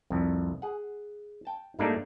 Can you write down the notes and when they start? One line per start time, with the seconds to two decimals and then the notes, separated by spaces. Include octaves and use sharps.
0.10 C2 F2
0.62 G#4 F#5
1.45 G5 A5
1.79 G#2 G3 A3 A#3 D4 D#4